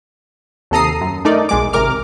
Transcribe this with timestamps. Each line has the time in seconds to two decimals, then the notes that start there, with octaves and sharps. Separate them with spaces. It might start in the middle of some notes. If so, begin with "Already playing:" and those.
0.71 D#2 C3 A4 A#5 D#6 C7
1.01 F#2
1.25 A3 D#4 A#4 D5
1.49 B1 G#3 D6
1.73 G#1 C3 A#4 D6 F6